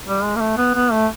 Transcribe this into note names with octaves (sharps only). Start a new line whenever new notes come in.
G3
G#3
A#3
A3
B3
B3
A3